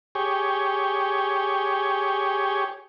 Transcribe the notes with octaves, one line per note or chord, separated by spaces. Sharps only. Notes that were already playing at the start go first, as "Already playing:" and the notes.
G4 G#4 C#5